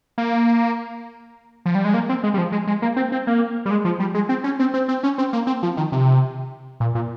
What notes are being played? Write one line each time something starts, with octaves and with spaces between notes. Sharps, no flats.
A#3
F3
G3
G#3
A#3
C4
G#3
G3
F3
G#3
G#3
A#3
C4
C4
A#3
G3
G#3
F3
G3
G#3
C4
C#4
C4
C4
C4
C#4
C4
A#3
C4
F3
D#3
C3
A#2
A#2